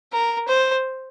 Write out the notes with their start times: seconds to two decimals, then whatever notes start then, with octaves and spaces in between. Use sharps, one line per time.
0.12 A#4
0.48 C5